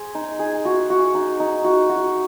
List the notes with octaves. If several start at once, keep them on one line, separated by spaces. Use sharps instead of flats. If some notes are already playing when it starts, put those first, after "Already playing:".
Already playing: G#4 C5
D#4
G#4
F#4
F#4
D#4
D#4
F#4
F#4